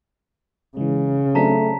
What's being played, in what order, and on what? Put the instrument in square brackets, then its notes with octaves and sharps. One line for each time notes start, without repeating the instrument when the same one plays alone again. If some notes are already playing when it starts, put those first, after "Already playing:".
[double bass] C#3 [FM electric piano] E3 G#3
[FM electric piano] F#3 C4 D4 [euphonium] A3 [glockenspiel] A5 A#5 B6